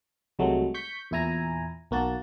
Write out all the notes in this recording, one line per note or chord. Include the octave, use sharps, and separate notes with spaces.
C2 C3 F#3 G#3 A3
C#6 G6 B6
E2 A#2 E4 G#5 A#5
B1 A#3 F#4 A5